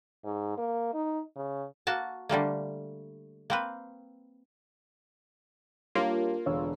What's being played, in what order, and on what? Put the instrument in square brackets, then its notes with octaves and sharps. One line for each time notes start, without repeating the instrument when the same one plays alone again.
[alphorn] G#2
A#3
D#4
C#3
[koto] A#3 F#4 A5
D3 G3 A3 A#3
A#3 C4 B4
[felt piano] G3 D4 [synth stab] A#3 [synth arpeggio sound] F4 [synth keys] G4 C#5
[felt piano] E1 D3 [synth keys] C#5 C#6 E6